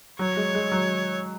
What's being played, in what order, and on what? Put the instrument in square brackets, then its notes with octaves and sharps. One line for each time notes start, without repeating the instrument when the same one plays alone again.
[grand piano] F#3 [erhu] C#5
[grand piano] G#3
G#3
F#3